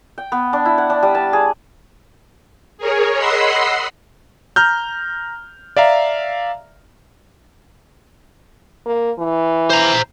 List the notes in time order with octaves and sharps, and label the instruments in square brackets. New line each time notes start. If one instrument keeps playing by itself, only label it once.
[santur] G5
B3
D4
E4
F#5
D4
G3
A5
G#4
[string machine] G#4 A#4 C#5
D#5 F#5 B5 C6 E6 C7
[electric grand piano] A#5 F6 G6
D5 E5 F5 A#5
[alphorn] A#3
E3
[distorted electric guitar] C5 A#5